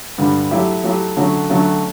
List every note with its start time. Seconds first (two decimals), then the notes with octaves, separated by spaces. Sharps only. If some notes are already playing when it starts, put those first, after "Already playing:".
0.18 G2 D3 G3
0.51 F#3 A3 E4 G4
0.84 F#3 A3 E4 G4
1.17 D3 F#3 A3 C#4 F#4
1.49 D3 F#3 A3 C#4 F#4